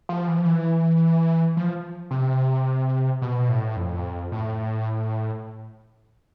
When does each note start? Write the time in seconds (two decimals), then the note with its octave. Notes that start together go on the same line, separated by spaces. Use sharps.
0.09 F3
0.28 E3
0.37 F3
0.45 E3
1.57 F3
2.11 C3
3.22 B2
3.49 A2
3.76 F2
4.32 A2